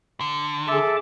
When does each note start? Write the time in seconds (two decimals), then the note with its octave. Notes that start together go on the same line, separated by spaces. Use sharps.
0.21 D3
0.68 G#4 A4 E5 A5 D6